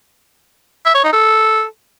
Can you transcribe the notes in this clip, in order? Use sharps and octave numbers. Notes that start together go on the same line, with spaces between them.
E5
C#5
D#4
A4